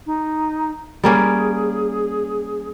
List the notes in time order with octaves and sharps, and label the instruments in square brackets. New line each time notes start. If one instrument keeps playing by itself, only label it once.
[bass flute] D#4
[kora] G3 A#3 C#4 [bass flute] G#4